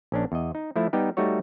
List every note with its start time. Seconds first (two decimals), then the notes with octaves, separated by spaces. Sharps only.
0.12 A#1 C#4 D4
0.32 E2 D#5
0.55 D#4
0.76 F3 A3 E4
0.93 G3 B3 D#4 G4
1.17 G3 A3 D#4 F#4 C#5